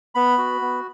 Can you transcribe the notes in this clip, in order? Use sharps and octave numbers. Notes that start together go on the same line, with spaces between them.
B3 B5
F#4
B3